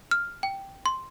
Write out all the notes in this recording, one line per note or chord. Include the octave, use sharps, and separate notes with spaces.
F6
G5
C6